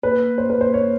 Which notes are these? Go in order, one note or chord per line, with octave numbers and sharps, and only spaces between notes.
A#3 B4
C5
B4
C5
C#5